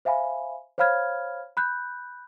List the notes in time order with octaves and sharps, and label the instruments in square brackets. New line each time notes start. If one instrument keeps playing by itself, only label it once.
[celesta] C5 E5 F5 G#5 B5
C5 C#5 F5 B5 F6 G#6
B5 F#6 G6